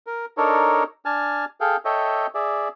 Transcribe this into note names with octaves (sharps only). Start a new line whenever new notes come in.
A#4
D4 D#4 A4 A#4 C#5
D4 G#5 A5 F6
G#4 A4 F5 G5
A4 C#5 D#5 E5 G5
G#4 D5 E5